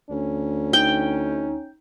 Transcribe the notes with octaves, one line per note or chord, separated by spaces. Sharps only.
D2 C#4
D#4 G5